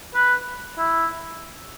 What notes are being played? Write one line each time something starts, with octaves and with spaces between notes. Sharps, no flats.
B4
E4